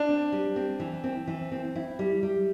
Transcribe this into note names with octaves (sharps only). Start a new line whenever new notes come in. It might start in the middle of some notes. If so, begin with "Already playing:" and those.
Already playing: D4
C4
G3
C4
E3
C4
E3
C4
E4
G3
G3